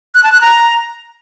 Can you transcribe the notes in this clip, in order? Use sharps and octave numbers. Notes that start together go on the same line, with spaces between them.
F#6
A5
F#6
A#5